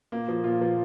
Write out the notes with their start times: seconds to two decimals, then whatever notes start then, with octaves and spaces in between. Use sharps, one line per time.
0.12 A#2 A#3
0.28 F3
0.44 A#2 F4
0.61 F3